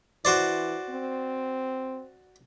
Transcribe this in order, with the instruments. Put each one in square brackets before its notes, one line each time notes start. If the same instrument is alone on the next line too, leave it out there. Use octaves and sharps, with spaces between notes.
[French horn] E3 [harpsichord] F#4 C5 D5
[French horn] C4